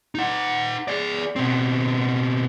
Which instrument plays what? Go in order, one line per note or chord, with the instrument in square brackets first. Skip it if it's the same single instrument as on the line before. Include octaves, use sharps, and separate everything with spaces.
[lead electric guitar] D#4 F#5
G#4 D5
B2 C4